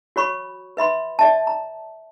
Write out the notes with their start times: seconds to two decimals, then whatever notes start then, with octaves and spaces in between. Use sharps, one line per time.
0.16 F#4 C#5 B5 C#6
0.77 B4 E5 B5 C6
1.19 D5 E5 A5
1.47 A#5